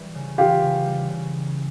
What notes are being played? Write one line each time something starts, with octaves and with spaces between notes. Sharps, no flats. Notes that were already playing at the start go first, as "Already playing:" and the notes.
Already playing: E3 G3
C#3
E3 F4 G4
C#3
G3
C#3